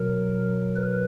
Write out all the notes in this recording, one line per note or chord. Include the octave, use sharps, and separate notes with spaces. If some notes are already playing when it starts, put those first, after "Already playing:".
Already playing: B2 F#3 A#4
B4